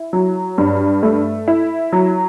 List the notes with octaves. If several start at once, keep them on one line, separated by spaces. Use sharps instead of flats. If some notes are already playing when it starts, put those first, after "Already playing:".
Already playing: E4
F#3
G2
A3
E4
F#3